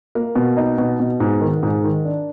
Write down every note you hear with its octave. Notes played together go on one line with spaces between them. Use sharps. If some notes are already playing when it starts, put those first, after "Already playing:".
A#3
B2
D#4
B2
B2
G#2
D#3
G#2
D#3
D4